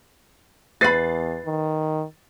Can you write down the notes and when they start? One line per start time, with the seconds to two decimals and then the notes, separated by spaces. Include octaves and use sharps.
0.81 E2 B4 B5 A6 C7
1.45 D#3